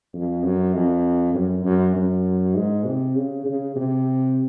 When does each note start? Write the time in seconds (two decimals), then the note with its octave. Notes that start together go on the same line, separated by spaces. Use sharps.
0.13 F2
0.43 F#2
0.74 F2
1.34 F#2
1.64 F#2
1.95 F#2
2.55 G#2
2.85 C3
3.15 C#3
3.45 C#3
3.76 C3